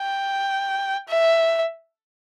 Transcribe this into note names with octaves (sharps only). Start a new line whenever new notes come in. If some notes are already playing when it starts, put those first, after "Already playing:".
Already playing: G5
E5